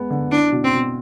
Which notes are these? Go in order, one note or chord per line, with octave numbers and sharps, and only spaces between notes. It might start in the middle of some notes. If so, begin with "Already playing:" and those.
Already playing: G#3 B3
D3
D4 E4
B2
C4
B2